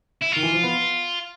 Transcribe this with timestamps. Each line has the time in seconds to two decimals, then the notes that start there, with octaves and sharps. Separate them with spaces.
0.21 E4
0.32 D#3 F4
0.43 E3
0.52 F3
0.63 B3